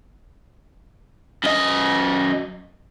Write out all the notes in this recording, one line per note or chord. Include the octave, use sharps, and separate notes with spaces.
F#2 D#5